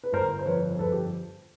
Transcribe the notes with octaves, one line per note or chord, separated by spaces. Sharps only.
B4
G1 A#4 C5
C5
F2 B4 C#5
C5
G1 A4 B4
G4